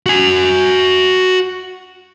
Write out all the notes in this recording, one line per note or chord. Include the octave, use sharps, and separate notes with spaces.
F#4 G#5